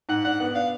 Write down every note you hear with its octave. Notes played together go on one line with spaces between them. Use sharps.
G#2 F#5
D4 F#5
B3 F#5
D4 F5